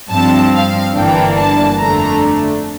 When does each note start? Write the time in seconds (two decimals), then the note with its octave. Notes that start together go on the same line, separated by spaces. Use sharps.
0.11 G2 F3 C4 A5
0.53 F5
0.95 G1 G2 E3 A#3 D4 G5
1.36 A5
1.79 F2 D3 A3 D4 A#5